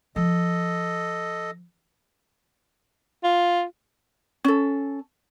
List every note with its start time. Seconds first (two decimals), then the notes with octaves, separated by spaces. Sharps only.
0.16 F3 A4 D#5
3.24 F4
4.44 C#4 A4